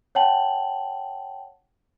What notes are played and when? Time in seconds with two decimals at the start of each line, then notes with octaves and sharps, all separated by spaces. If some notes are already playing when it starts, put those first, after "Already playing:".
0.15 C#5 F#5 G5 A5 F#7